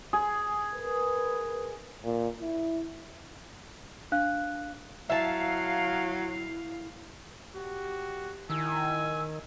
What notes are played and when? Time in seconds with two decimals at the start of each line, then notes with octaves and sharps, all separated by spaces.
0.13 G#4
0.74 A#4 B4
2.04 A#2
2.41 E4
4.12 D4 F5 F#6
5.10 F#3 E4 E5 F5 A5
7.55 F#4 G4
8.50 D#3 E4 G#5 E6